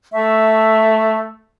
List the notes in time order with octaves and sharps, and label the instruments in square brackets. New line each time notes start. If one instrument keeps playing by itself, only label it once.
[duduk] A3 [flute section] E5 A5 C#6